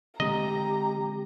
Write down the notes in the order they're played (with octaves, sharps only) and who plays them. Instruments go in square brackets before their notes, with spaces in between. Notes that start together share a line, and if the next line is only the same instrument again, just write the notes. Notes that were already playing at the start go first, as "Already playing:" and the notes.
[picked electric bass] D3 G#3 C4 [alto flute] G4 [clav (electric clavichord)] D#5 [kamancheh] A#5